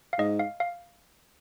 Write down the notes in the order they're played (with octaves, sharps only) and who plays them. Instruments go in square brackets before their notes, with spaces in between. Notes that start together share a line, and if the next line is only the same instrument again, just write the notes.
[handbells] F5
[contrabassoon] G#2 [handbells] D#5
[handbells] F5
F5